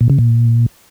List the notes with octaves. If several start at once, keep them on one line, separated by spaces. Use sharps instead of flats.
A#2
C#3
A#2